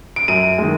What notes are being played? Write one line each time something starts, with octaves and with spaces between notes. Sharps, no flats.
D7
F#2 D#7
D#3 G#3